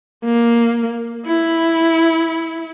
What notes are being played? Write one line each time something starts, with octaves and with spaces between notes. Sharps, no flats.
A#3
E4